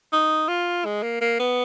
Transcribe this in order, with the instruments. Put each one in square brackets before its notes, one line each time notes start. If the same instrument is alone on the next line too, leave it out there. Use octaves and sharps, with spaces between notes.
[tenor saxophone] D#4
F4
G#3
A#3
A#3
B3